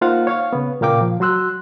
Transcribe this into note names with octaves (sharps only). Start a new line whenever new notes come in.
A#3 D#4 F4 C5 F5 F#5
C#5 F5 C#6
C#3 B3
A#2 C#3 A#3 F5 G5 D6
F3
F#3 F#4 C6 E6 F#6